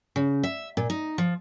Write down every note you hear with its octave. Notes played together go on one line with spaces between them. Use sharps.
C#3
E5
A#2
D#4
F3